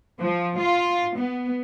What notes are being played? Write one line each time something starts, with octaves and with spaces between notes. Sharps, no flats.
F3
F4
B3